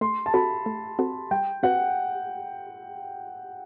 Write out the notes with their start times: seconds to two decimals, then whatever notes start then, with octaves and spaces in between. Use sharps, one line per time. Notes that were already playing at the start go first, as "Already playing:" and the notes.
0.01 A3 C6
0.26 A5
0.34 C4 F#4 A4 B5
0.66 A3
0.99 C4 F#4 A4
1.31 G3 G5
1.63 C4 F#4 B4 F#5